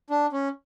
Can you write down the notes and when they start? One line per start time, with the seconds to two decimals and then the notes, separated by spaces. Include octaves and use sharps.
0.10 D4
0.32 C#4